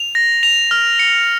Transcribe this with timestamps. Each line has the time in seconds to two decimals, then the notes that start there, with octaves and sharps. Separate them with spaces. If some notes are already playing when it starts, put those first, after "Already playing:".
Already playing: F7
0.15 A#6
0.43 F7
0.71 F6
0.99 C#7